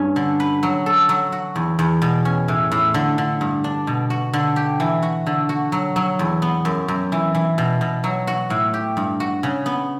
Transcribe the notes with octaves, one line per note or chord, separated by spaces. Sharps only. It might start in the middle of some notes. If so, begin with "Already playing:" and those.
Already playing: G2 C#4
D3
B4
F#3
A4
F#3
F#4
E2
E2
B2
C#4
A2
A2
D3
D3
G2
D4
B2
F#4
D3
G4
E3
F#4
D3
F#4
F#3
F#3
E2
B3
F#2
F#2
E3
E3
B2
B2
F#3
F#4
A2
G4
G2
F#4
C#3
B3